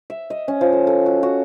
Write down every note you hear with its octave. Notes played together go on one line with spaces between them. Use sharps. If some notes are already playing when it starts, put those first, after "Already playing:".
E5
D#5
C#4
F3
A4
A4
F#4
F#4